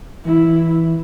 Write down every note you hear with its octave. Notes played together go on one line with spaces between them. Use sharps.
E3 E4